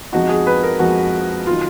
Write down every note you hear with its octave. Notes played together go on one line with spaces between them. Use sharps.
F2 F3 G#3 D#4 F#4
G#4
B4
A#4
F2 F3 G#3 D#4 F#4
D#3 F#3 F4